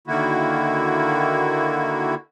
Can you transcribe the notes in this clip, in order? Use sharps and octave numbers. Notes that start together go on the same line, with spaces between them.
D3 D#3 A#3 E4 F#4